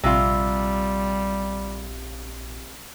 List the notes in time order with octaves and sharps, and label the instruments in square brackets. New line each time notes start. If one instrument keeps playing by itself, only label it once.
[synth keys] A#1 [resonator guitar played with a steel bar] C3 F4 [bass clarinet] G3